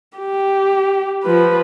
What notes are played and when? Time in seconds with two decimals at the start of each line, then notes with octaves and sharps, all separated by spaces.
0.18 G4
1.24 F3 B4